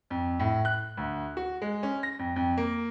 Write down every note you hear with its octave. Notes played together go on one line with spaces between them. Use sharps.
F2
A2
F#6
D2
F#4
G#3
C#4
A#6
F2
F2
A#3